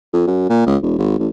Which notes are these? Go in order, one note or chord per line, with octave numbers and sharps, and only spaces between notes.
F2
F#2
A#2
C#2
E1
G#1
A1